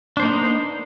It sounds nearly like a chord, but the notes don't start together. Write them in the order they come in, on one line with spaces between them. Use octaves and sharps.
D4 C5 A#3 D#4 B3